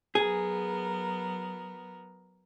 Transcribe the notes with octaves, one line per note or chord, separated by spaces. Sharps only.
F#3 B3 G#4 A#4